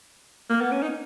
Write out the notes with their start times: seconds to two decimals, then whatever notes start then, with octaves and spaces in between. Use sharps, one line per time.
0.49 A#3
0.61 B3
0.72 C#4
0.82 D#4